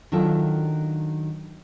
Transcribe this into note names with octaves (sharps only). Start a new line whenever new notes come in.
D#3 F#3 D4 F4 A4